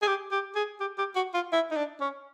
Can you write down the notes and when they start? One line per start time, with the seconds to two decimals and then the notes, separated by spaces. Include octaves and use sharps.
0.02 G#4
0.07 G4
0.31 G4
0.55 G#4
0.80 G4
0.98 G4
1.15 F#4
1.34 F4
1.52 E4
1.71 D#4
1.76 D4
2.01 C#4